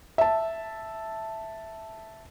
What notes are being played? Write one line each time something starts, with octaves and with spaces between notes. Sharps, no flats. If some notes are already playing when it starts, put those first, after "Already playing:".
E5 A5